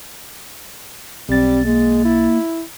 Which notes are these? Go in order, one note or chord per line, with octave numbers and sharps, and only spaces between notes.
B1 G3 C4 A6
G#3 A#3
E4